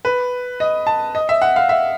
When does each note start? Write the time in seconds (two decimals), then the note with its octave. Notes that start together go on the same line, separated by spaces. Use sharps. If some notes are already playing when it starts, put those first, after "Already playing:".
0.05 B4
0.60 D#5
0.87 A5
1.15 D#5
1.29 E5
1.42 F#5
1.56 F5
1.69 E5